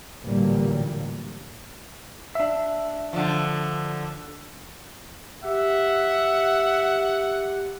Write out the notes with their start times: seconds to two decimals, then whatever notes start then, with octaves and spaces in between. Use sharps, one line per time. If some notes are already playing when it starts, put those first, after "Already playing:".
0.23 A1 A#2 D3 F#3 G3 A#3
2.35 D4 E5
3.13 D3 F3
5.44 G4 E5 F#5